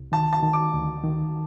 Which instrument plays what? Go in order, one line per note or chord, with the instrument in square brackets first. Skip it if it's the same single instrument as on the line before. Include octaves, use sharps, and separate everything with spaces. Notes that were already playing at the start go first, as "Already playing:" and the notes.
Already playing: [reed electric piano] C2
[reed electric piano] D#3 [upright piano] A5
[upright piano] A5
[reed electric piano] D#3
[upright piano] D6
[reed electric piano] D2
D#3